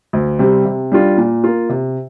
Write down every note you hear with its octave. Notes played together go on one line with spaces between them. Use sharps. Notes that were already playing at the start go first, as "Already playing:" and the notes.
D2
C3 G3 C4
C3
G3 D4 F4
A#2
A#3 F4
C3